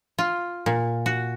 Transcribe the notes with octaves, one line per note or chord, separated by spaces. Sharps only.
F4
A#2
F#4